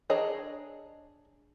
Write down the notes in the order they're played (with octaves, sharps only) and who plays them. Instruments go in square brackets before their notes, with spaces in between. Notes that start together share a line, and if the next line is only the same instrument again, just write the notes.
[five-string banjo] D4 G#4 C#5 D#5 A#5